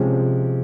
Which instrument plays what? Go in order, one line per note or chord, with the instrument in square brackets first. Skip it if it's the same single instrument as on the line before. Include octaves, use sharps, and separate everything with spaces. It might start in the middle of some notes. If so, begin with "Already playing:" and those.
Already playing: [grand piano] C3 F3 G#3 C#4